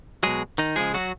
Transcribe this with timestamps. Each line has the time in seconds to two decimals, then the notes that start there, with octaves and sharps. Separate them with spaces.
0.23 B2 F#3 G#3 G#4
0.58 D#3 D#4
0.76 C#3 F3 G#3 G#4
0.94 F#3 F#4